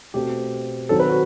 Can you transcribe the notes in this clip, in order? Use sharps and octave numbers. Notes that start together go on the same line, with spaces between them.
B2 A3 C4 G4
D#3 F#3 C4 A4
B4
F#4